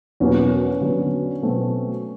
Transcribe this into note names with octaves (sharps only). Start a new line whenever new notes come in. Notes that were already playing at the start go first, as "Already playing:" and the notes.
E2 B2 F#3 A#3 C#4
D3 F#3 B3
B2 F#3 A3 C4